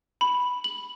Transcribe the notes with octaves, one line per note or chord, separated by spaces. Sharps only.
B5
F#7